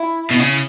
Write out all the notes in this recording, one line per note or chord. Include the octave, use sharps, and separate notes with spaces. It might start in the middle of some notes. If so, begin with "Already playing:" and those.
Already playing: E4
B2
C#3